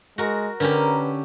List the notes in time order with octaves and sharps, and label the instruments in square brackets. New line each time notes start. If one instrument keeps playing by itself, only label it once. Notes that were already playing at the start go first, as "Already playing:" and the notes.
[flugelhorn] G#3 [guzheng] F#4 A#4
[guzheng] D3 C#4 G4 [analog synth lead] A#4 [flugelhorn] B4